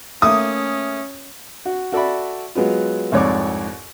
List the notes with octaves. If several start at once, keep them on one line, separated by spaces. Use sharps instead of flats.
A3 A#3 C#4 D#6
F#4
F#4 A4 D5 E5 B5
F#3 G#3 B3 F4
C2 F2 G#2 C#5 D5 D6